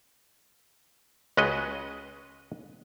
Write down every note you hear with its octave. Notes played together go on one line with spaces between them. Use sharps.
C#2 C#3 G#3 F#4 B4 D#5